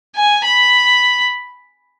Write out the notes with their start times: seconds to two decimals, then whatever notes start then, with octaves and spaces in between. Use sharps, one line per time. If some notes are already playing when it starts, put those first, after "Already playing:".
0.16 G#5
0.44 B5